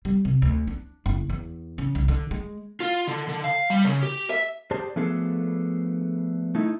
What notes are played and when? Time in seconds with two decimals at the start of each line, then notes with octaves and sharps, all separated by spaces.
0.05 G3
0.25 C3
0.42 D2
0.67 D4
1.06 F#1
1.30 E2
1.78 C#3
1.95 C2
2.08 D3
2.31 G#3
2.80 F4
3.08 D3
3.29 D3
3.44 F5
3.70 G3
3.84 C#3
4.03 G4
4.30 E5
4.71 G4 G#4 C5 D5 A5
4.96 F3 A3 B3 D4 G#4 A4
6.55 A3 D#4 E4